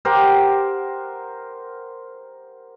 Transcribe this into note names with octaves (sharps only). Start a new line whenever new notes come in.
G4 A#4 C5 F#5